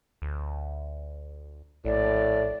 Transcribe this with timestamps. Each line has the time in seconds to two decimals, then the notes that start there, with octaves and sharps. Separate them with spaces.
0.22 D2
1.85 A#1 A2 D5